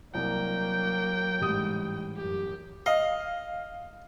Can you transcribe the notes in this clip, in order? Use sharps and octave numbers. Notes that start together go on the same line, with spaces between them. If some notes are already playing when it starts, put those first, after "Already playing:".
C2 F#3 A#3 G5
A1 G#2 G3 G#3 D#6
F#2 G4
D#5 F5